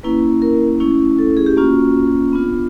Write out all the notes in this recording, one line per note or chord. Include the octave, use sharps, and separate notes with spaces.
A#3 C#4 E4 B4
A#4
A3 C#4 E4
A4
G#4
G4
A#3 C#4 F4 F#4
B3 D4 F4